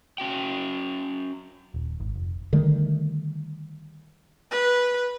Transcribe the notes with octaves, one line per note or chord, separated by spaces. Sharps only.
C#4 F#4 G5
D#1
G#1
F1
D3 D#3 G3 A3
B4